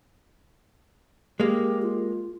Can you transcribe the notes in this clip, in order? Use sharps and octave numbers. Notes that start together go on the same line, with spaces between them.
G#3 A#3 G4
F4